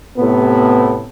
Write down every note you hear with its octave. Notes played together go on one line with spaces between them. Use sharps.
A2 C3 B3